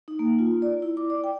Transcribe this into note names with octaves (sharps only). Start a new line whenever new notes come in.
D#4
A#3
F4
D5
E4
D6
D5
G5